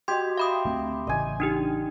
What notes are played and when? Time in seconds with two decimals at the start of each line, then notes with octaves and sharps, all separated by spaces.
0.08 F#4 G4 D#5 C6 G#6
0.38 E5 F5 B5 C6 D6 D#6
0.65 D2 A3 C4
1.07 A1 C#3 E3 D#5 G#5
1.40 D4 D#4 G4